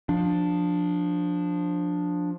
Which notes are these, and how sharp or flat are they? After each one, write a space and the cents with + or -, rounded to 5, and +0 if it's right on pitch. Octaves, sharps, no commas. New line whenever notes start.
F3 +15 D4 +0